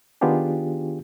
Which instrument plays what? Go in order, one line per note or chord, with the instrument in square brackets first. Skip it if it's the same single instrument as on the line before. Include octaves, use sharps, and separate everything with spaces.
[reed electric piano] D#3 B3 D4 F4 G4 G#4